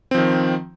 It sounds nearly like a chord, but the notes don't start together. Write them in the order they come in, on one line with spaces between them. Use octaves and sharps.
C4 F3 D#3